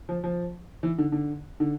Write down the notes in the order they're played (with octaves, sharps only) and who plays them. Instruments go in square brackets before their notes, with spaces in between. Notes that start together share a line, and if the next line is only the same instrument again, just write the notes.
[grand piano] F3
F3
E3
D3
D3
D3